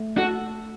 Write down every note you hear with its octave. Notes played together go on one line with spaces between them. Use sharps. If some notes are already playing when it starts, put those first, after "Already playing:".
Already playing: A3
F#4 A4